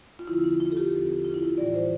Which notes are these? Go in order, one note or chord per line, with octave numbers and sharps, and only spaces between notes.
F4
E2 D3 F3 C4 E4
E4
F4
A4
G4
E2 D3 F3 C4 A4
F4
E4
F4
A2 E3 G3 D5
C5